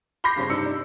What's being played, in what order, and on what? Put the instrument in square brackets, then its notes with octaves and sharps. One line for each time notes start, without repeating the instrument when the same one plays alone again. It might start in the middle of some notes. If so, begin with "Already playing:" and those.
[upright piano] B5 C6 D6 G6 A#6 C7
G2 C#3 C4 C#4
G2 C3 D4 D#4 E6 C#7
D4